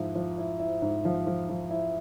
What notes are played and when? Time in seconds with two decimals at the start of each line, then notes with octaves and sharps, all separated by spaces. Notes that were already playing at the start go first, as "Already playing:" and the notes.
Already playing: G#2 F3 E4
0.15 F3
0.38 E4
0.60 E4
0.82 G#2
1.05 F3
1.27 F3
1.49 F3
1.70 E4